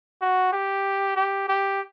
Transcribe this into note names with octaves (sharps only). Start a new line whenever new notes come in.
F#4
G4
G4
G4